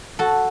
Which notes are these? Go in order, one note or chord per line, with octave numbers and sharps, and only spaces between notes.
F#4 A4